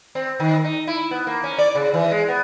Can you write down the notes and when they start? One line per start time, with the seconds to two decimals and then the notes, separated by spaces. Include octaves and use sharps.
0.15 C4
0.40 D#3
0.64 D#4
0.87 E4
1.11 B3
1.27 A#3
1.44 C#4
1.58 D5
1.75 C#3
1.94 E3
2.11 G#3
2.28 B3